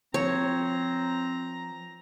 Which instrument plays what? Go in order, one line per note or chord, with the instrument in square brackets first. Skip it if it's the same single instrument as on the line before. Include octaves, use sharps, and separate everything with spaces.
[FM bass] F3 [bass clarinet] C4 [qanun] C#5 [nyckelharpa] A#5